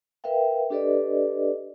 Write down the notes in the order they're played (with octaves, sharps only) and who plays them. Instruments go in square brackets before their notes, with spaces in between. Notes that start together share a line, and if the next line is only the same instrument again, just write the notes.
[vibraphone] A#4 B4 E5 F5 G5
D4 G4 A4 B4 D5 D#5